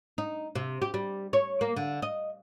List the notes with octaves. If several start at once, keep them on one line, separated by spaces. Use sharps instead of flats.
D#4
C3
G4
G3
C#5
A#3
D3
D#5